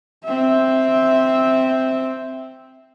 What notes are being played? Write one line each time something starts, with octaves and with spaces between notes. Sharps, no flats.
C4 E5